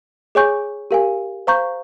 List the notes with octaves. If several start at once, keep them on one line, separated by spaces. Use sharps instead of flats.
G#4 C#5 G#5 C#6 G6
G4 A#4 F5 G#5
C5 F5 A#5 C#6 G6